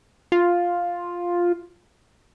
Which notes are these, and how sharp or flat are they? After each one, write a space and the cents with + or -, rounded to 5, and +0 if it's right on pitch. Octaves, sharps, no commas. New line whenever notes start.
F4 +5